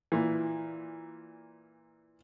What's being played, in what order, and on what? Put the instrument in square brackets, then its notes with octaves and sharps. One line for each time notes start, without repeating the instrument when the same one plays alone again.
[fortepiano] A#2 E3